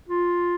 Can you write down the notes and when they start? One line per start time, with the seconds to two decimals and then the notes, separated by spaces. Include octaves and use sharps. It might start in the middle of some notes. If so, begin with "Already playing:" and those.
0.09 F4